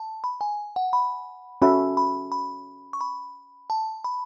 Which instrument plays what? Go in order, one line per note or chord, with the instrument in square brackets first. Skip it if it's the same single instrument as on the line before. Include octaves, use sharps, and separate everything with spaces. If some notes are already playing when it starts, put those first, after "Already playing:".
Already playing: [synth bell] A5
B5
G#5
F#5
B5
[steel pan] C#4 F#4 A4 E5 [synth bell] B5
[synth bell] B5
B5
C#6
B5
A5
B5